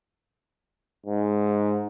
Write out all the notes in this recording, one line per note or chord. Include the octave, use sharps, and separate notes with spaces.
G#2